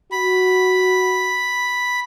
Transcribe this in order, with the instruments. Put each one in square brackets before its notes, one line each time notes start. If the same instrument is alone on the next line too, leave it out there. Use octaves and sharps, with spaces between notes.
[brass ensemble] F#4 [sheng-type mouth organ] B5